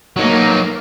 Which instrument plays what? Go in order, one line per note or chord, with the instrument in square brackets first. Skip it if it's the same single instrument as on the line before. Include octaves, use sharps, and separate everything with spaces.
[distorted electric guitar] F#3 D#4 [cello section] A#3